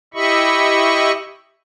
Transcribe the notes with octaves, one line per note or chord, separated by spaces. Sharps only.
E4 G4 D#5 E5 B5 C#6